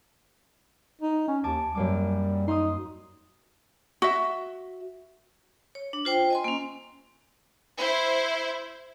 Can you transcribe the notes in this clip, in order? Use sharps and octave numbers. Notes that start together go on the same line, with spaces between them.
D#4
C#4
D#2 G#5 A5 D6
F#2 G3 A#3 D6
D#4 C6 D#6
F#4 E5
C#5
D4
F4 C5 G5
D#5 G#5 C6
A#3 C#4
E4 C5